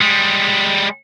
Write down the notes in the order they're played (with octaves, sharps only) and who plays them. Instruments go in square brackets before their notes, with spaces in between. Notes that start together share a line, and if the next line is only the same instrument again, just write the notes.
[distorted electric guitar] G3 G#3